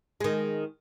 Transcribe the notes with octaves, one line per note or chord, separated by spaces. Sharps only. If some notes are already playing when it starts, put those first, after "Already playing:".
D#3 G#3